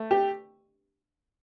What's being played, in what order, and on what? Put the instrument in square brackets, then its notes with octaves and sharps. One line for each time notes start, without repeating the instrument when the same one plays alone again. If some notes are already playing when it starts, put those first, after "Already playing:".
Already playing: [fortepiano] A3
G4